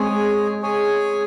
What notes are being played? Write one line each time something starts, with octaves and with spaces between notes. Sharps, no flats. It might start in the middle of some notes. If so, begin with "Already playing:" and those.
Already playing: G#3 C4 G#4 C#5 G#5
G#4 C#5 G#5